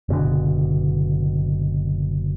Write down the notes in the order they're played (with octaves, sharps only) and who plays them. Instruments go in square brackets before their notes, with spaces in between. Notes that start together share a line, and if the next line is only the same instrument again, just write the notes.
[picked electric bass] F#1 B2 D3